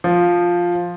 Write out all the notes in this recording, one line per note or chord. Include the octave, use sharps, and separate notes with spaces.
F3